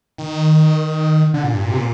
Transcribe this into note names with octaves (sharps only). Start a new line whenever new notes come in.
D#3
D3
A#2
G2
A#2
C3
A#2